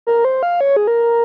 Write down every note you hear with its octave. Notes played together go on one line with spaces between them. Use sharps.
A#4
C5
F5
C#5
G#4
A#4